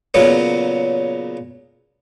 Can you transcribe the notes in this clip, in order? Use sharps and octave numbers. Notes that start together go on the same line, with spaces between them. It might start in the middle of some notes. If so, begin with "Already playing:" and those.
A#2 C#3 F#3 B3